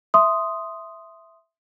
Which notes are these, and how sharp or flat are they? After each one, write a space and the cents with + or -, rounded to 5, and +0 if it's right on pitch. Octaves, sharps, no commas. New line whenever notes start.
E5 +0 C6 +0 D#6 +0